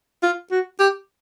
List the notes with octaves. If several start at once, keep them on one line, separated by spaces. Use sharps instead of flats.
F4
F#4
G4